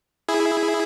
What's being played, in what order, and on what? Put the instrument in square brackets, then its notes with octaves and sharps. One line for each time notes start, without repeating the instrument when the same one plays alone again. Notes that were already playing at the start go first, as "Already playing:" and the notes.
[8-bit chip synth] E4 G#4